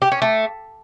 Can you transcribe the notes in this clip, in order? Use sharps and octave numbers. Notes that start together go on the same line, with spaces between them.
G4
C#4
A3